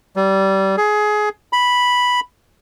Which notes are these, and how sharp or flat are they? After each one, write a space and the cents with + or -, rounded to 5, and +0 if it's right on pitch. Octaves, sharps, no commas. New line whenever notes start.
G3 -20
G#4 +20
B5 -5